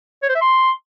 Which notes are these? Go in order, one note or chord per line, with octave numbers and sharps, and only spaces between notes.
C#5
C5
E5
C6